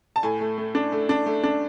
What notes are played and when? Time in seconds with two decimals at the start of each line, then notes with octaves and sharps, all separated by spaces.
0.16 A5
0.23 A2 G#5
0.41 A3
0.58 A3
0.75 D4
0.92 A3
1.09 D4
1.26 A3
1.44 D4